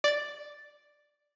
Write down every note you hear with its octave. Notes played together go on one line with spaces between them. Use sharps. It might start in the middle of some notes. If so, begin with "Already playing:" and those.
D5 A6